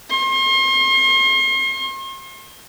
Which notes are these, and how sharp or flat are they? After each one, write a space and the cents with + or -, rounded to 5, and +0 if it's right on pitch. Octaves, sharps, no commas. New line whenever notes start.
C6 +40